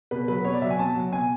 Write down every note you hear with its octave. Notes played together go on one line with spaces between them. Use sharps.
B2 B4
F#3 B4
B2 C#5
D5
F#3 E5
G#5
B2 A5
F#3
B2 G#5